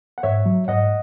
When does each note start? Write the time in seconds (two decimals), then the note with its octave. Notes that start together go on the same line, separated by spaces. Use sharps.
0.18 F#5
0.23 G#2 C#5 E5
0.46 F#3
0.68 G#2 D#5 F#5